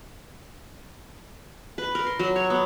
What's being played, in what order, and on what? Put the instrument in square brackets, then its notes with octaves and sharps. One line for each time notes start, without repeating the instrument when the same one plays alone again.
[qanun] B4
A#4
C6
F#3
C#5
B3